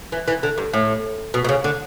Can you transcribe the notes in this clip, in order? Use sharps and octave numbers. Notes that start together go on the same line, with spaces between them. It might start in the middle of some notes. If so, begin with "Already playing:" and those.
E3
E3
D3
G2
A2
B2
B2
C#3
D3